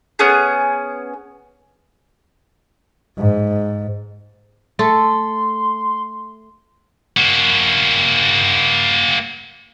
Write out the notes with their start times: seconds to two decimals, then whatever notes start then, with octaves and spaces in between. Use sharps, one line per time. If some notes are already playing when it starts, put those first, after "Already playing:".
0.19 B3 C#4 G#4
3.18 G#2
4.79 A3 A4 C6
7.17 A#3 F#4